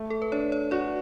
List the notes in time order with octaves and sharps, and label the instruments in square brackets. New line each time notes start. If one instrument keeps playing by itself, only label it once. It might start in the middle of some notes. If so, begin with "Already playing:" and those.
Already playing: [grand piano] A3
[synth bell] A4
B4
[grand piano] D4 [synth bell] C#5
[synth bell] C#5
[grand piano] F#4 [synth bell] D5